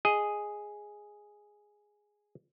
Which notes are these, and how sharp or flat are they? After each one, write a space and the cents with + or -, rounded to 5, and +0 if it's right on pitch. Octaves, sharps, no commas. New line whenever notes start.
G#4 +0 D#5 +0